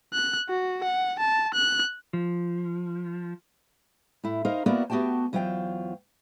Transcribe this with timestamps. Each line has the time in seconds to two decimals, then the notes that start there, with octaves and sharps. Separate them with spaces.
0.14 F#6
0.49 F#4
0.84 F#5
1.19 A5
1.54 F#6
2.13 F3
4.24 A2 E4
4.45 D#4 A#4 C5 F5
4.66 A#3 B3 E4 F#4 A#4 D5
4.90 A3 B3 F#4 G4 G5 A5
5.33 E2 F#3 F4 C5 G5